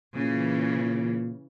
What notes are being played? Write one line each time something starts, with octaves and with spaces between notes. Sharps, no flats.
A#2 C#3 E3